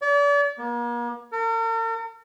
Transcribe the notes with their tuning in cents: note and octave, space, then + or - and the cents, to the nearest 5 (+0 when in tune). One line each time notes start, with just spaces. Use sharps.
D5 -40
A#3 +40
A#4 -45